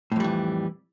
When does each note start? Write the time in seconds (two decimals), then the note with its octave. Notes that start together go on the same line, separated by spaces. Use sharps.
0.12 A2
0.16 F2
0.20 G3
0.24 E3